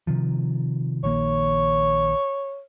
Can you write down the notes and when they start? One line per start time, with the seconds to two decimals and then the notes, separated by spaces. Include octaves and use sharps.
0.07 C3 D#3 F3
1.04 A#1 D#3 A#3 C#5